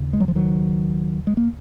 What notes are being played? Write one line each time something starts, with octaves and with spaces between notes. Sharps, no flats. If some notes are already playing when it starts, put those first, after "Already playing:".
Already playing: D#2 C#3
G#3
F#3
F3
D#3 F#3
G#3
A#3